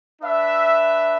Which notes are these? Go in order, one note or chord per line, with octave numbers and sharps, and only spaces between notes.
D4 B4 E5